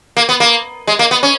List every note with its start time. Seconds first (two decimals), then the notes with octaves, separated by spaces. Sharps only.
0.17 A#3
0.29 B3
0.40 A#3
0.87 G#3
0.99 A#3
1.11 B3
1.23 C#4